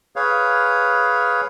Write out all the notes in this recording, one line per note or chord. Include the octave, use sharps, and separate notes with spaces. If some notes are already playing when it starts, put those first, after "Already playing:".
G#4 B4 C#5 F5